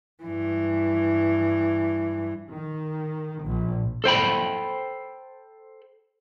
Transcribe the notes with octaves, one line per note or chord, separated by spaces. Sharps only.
G2 E3
D#3
A#1
A4 C5 G5 B5